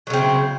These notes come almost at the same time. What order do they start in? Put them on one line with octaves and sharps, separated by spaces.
F#3 C#3 C4 E4